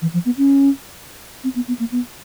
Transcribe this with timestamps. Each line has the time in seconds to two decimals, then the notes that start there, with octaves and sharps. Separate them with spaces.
0.02 E3
0.14 F3
0.25 B3
0.37 C#4
1.44 C4
1.56 B3
1.68 B3
1.80 A#3
1.92 B3